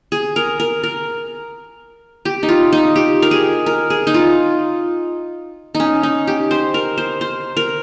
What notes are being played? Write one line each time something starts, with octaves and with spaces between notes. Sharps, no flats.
G#4
A#4
A#4
A#4
G4
D#4
F4
D#4
G4
A#4
G#4
A#4
G#4
D#4
F4
D#4
C#4
D#4
G4
C5
A#4
C5
C5
A#4